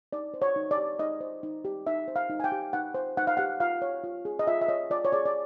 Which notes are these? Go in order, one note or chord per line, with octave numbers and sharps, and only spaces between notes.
D#4 D5
C5
C#5
D#4
D5
G4
D#4 D#5
C5
D#4
G4
D#4 E5
C5
F5
D#4
G#5
G5
G4
D#4 F#5
C5
D#4 F#5
F5
G4 F#5
F4 F5
C#5
F4
G#4
D#5
F4 E5
E5
C#5 D#5
F4 D5
C#5
G#4 D5
D5